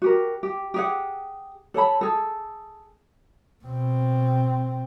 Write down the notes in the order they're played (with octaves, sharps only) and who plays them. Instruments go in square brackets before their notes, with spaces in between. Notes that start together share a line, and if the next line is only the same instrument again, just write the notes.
[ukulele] F#4 G4 A#4
G4
G4 G#4 F#5
A4 C#5 A5 B5
G#4 A4
[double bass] B2 C4